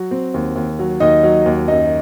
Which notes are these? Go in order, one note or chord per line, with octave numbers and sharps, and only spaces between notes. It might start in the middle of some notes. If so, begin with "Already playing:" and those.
Already playing: F#3 F#4
C4
D#2
D#2
F#3
D#2 D#4 D#5
F#3
D#2
F#2 D#4 D#5